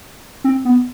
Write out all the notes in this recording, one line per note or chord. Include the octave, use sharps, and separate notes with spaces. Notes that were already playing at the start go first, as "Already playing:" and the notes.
C4
B3